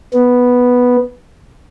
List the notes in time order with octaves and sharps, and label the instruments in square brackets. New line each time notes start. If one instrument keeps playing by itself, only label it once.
[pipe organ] B3